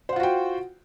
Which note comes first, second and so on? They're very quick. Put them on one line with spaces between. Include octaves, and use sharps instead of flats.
C5 F#5 F4 F#4 G5